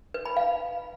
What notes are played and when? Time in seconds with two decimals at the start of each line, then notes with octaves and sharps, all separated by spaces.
0.14 B4
0.26 B5
0.37 F5